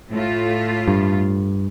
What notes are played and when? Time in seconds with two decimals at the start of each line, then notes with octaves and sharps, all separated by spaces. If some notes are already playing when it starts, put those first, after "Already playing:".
0.11 A2 A3 F4
0.88 G2